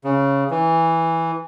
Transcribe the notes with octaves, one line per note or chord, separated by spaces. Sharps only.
C#3
E3